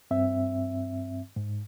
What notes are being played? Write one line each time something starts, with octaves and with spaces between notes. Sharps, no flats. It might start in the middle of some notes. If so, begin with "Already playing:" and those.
G2 C4 E5
G#2